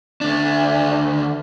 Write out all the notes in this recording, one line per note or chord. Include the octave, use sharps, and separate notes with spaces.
D2 D4